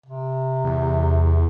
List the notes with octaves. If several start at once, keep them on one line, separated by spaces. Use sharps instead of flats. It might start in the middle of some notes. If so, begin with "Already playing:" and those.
C3
E2